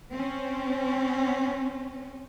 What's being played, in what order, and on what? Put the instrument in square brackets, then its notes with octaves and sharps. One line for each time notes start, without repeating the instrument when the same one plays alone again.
[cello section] C4 C#4